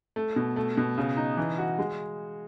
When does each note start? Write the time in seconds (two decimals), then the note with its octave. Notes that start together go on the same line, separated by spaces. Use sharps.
0.16 A3
0.36 B2
0.56 A3
0.77 B2
0.98 C#3
1.17 D#4
1.37 E3
1.58 F#4
1.79 G#3